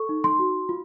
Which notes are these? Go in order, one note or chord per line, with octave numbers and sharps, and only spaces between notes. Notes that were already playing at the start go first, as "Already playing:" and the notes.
Already playing: A4 C#6
D#4
C6
F#4
F4